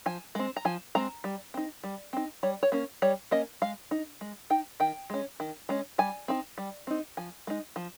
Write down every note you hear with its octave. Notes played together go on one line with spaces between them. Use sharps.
F3 G#5
G#3 C4
A#5
F3 G#5
G#3 C4 A#5
G3
C4 D#4
G3
C4 D#4
G3 C#5
C#5
A#3 C#4
G3 C#5
A#3 C#4 D#5
G#3 F5
D#4
G#3
D#4 G5
D#3 G5
G#3 C#4
D#3
G#3 C#4
G3 G#5
C4 D#4
G3
C4 D#4
F3 G#5
G#3 D#4
F3